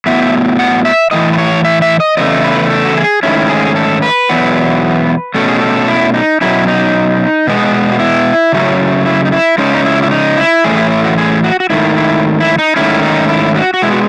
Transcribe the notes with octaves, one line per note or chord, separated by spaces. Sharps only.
A2 F#3 B3 E5
F#5
E5
A2 E3 A3 D#5
B4
C#5
E5
E5
D#5
E2 C#3 A3 D#5
B4
A4
F#4
G#4
G#2 D#3 F#3 A3 C#4 E4
G#4
A4
B4
E2 B2 F#3 B3
B2 A3 C#4 A4
G#4
A4
E4
D#4
B2 F#3 C#4 E4
D#4
B2 G#3 B3
F#4
E4
C#3 F#3 A3 C#4
E4
D#4
E4
C#3 G#3 C#4 D#4
D#4
E4
E4
D#4
E4
A2 E3 A3 C#4 G#4
E4
E4
F#4
G#4
F#4
F#4
G#2 D#3 A3 E4
E4
E4
D#4
G#2 D#3 A3 C#4 E4
D#4
E4
F#4
F#4
B2 G#3 B3 E4
F#4